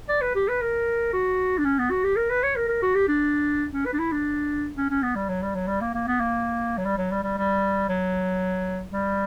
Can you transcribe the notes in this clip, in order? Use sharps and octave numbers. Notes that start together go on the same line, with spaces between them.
D5
B4
G4
B4
A#4
F#4
D4
C#4
B3
F#4
G4
A#4
B4
C#5
A#4
A#4
F#4
G4
D4
C#4
B4
D4
E4
D4
C#4
C#4
B3
G3
F#3
G3
F#3
G3
A#3
A#3
B3
A#3
F#3
G3
F#3
G3
G3
G3
F#3
G3